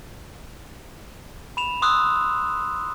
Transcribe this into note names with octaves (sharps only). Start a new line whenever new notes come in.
B5 E7 F7
C6 D#6 E6 F#6